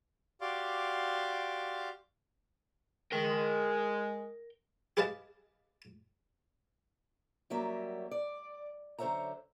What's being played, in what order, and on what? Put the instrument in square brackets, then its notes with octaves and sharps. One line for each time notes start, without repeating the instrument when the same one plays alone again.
[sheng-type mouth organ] F#4 G4 D5 F5 C6 D6
[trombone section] G#3 [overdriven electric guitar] A#4 G5
[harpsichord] G4 G#4 B4 D#5 F5 A5
[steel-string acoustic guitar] F#2 F#3 G3 A#3 E5
D5
F#2 D3 C5 C#5 E5 A#5